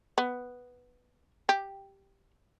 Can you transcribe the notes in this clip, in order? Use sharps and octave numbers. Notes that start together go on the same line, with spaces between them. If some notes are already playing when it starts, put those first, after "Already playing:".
B3
G4